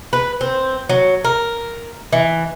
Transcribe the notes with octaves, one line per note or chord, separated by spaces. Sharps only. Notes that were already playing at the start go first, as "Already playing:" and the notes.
B4
C4
F#3
A#4
E3